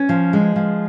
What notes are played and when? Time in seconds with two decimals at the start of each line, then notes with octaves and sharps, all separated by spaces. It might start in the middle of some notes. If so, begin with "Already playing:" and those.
Already playing: C#4
0.09 F3
0.33 G#3
0.56 F3